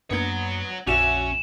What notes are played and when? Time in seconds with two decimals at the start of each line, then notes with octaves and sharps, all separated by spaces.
0.11 F#2 A#3 B3 D4 C#5 F#5 G#6
0.87 A#1 F2 C#4 F#4 D5 E5 E7 F7